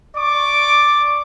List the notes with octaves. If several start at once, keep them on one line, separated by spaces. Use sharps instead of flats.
D5 C#6 D6